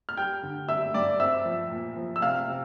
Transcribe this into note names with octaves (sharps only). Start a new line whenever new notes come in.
F6
G3 G5 G6
D3
G3 E5 E6
G2 D5 D6
C4 E5 E6
F3
A#2
F3
E6
C3 F5 F6
C3